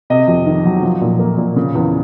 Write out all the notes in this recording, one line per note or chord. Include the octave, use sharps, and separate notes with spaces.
C3 D#5
F2
D#3
F#3
F3
A#2
A#3
A#2
C#3
E2